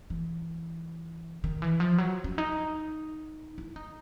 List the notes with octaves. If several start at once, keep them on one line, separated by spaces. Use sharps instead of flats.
E3
D#3
E3
F3
F#3
C#4
D#4
E4
D#4